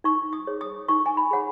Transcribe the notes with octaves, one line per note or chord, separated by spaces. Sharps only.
D#4 C#6
D#6
G#4 C#5
D#6
D#4 C#6
G#5
B5
G#4 C#5 F#5